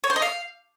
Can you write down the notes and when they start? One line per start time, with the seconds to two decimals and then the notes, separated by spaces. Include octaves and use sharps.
0.04 C#5
0.10 C5
0.16 D#5
0.22 F5